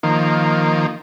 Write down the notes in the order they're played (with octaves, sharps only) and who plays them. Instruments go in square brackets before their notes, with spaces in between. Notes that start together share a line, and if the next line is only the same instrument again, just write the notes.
[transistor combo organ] D#3 F3 A#3